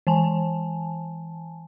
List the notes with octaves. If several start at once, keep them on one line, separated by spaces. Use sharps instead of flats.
E3 G#5 A5